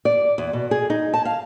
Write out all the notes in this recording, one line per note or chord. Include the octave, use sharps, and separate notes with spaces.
D5
E2
B2
G#4
D#4
A5
F5